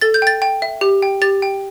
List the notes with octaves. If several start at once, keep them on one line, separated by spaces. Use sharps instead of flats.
A4 A6
G6
G5 A6
G5
E5
G4
G5
G4 A6
G5